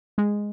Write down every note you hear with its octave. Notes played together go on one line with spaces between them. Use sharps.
G#3